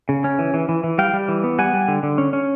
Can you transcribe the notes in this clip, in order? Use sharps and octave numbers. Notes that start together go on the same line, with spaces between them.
C#3
C#4
E3
E3
E3
E3
G3 F5 G5
G3
E3
B3
G3 F#5 G#5
G3
D3
D3
C#4
C#4